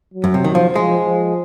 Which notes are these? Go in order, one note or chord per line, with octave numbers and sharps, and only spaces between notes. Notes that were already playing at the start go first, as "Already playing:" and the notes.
F#3
F#2
C3
D#3
F3
F3 G#3
F3